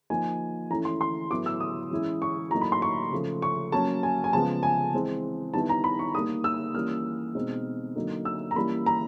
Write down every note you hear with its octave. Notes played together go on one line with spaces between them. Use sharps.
F3 A#3 D#4 G#5
E3 A3 C#4 E4 A#5
C6
C6
A2 F#3 B3 E4 D6
E6
D#6
E3 G#3 C#4 E4
C#6
A2 F#3 A#3 D#4 A#5
B5
C6
C#6
C#3 F3 A3
C#6
F#3 A#3 C#4 A5
G#5
G#5
C#3 F3 G#3 B3 A5
G#5
E3 G#3 C4
D#3 G3 B3 E4 A5
A#5
B5
C#6
D#3 G3 A#3 D#6
E6
E3 G3 A#3 C#4 F6
B2 G#3 C4 D#4
D3 F#3 A#3 D#4
E6
A#5
E3 G3 A#3 C#4 B5
A#5